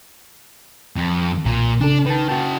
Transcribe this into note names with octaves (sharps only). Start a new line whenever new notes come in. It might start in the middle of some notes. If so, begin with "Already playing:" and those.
F2
B1 A#2
C#3 D4 A4
D#3 B4 A5
C#3 F#4 G5 A5